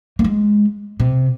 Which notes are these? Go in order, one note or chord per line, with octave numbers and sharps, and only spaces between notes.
A#3
G#3
C3